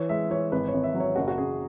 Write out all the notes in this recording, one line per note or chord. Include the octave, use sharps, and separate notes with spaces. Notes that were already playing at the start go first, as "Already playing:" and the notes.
Already playing: E3 C#5
G#3 E5
E3 C#5
G#1 B4
C#5
G#1
E5
F#3
C#5
F#1 F#4
F#4
F#1 G#4